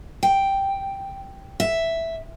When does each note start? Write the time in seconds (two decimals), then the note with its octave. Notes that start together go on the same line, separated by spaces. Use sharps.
0.23 G5
1.60 E5